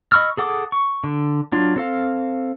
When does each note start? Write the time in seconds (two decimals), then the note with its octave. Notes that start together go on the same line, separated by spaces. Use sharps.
0.12 D#5 B5 C#6 E6 F6
0.37 G#4 A4 F#5 D6 D#6
0.72 C#6
1.04 D3
1.52 F#3 D4 F4
1.76 C4 A4 F5